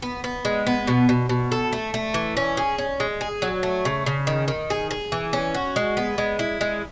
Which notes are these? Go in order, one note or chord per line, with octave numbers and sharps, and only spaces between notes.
B3
B3
G#3
B3
B2
B2
B2
A4
A3
A3
E3
C#4
G#4
C#4
G#3
G#4
F#3
A3
C#3
C#3
D#3
D#3
G#4
G#4
E3
C#4
F#4
G#3
B3
G#3
E4
G#3